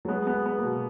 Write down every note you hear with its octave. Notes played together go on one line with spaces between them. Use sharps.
F#3
G#3 B3
B3
G#3
B3
A#3
B2